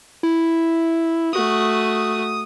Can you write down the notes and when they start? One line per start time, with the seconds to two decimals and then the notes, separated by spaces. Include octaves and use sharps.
0.23 E4
1.33 A3 F#4 D#6